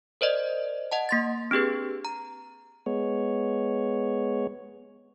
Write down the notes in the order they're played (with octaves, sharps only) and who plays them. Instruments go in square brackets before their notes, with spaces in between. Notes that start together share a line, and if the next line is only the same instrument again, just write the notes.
[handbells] A#4 C5 D5 D#5
D#5 F#5 A5
A#3 C6 A6
C4 D4 G4 G#4 B4
A#5
[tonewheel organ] G#3 B3 C#5